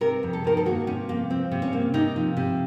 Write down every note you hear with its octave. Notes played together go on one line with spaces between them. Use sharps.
C3 A#4
F2
A4
D#3 A#4
A4
A#3 F#4
C3 C#4
F2 A#3
F3 C4
C3
C#4
A#3
C3 D#4
F3
C3